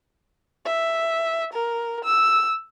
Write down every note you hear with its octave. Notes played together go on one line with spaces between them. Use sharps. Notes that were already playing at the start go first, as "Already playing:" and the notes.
E5
A#4
E6